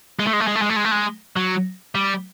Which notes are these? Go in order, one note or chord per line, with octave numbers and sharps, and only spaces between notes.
G#3
A3
G#3
A3
G#3
A3
G#3
A3
G#3
A3
G#3
F#3
G3